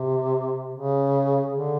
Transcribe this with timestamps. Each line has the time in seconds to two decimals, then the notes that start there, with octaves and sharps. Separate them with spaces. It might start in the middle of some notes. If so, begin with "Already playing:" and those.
Already playing: C3
0.75 C#3
1.53 D3